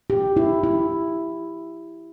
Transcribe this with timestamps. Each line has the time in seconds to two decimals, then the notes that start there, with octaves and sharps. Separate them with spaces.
0.10 G4
0.37 E4
0.64 E4